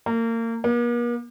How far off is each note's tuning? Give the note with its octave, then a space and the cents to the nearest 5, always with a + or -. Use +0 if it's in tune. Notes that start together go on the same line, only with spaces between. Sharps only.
A#3 -30
A#3 +45